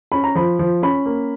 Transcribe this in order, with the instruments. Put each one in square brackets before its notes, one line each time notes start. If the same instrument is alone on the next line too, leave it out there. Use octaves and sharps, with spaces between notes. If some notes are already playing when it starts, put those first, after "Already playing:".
[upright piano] C#4 B5
A#5
F3 B5
F3
C#4 B5
A#3